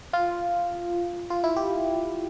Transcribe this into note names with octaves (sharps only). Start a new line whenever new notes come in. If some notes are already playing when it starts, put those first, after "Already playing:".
F4
F4
E4
G4